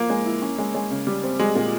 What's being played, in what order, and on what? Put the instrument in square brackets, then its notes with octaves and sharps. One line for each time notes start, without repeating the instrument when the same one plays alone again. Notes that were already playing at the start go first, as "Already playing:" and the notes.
Already playing: [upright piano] F3 [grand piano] A#3
[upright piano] G#3
E4
C#4
G#3
G#3
C#3
G3
C4
[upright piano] G3 [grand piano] G#3
[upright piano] A#2